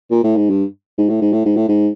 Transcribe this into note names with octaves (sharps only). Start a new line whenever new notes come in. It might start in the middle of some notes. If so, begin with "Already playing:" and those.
A#2
A2
G#2
G2
G#2
A2
G#2
A2
G#2
A2
G#2